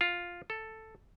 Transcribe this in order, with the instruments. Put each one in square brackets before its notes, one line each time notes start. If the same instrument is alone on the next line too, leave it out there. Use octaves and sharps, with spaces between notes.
[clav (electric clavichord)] F4
A4